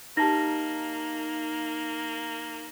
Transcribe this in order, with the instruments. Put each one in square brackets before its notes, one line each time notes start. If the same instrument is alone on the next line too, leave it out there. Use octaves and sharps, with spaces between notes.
[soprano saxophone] A#3 [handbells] D#4 [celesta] G4 A5 A#6